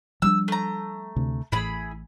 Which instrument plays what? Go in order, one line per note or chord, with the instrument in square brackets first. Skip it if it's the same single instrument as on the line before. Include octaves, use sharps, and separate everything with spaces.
[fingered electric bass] F3 G3 D4 [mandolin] E6
[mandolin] A3 A#5
[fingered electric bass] D2 C3
[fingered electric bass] A1 A2 [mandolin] E4 G#4 B5